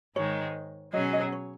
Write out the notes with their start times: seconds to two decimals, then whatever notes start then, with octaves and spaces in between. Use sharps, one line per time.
0.16 G#2 D#3 G#3 D#4 C#5
0.93 B2 F#3 C#4 G#4 D#5
1.13 D#5
1.32 C#5